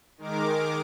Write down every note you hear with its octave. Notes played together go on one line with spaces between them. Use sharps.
D#3 G#3 A#4 D6